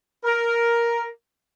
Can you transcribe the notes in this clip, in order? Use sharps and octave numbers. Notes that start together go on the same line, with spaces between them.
A#4